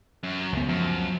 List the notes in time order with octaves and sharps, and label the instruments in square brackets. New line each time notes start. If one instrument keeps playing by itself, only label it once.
[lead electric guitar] F#2
[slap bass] C#2 B3
[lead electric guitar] F#2 [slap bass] F3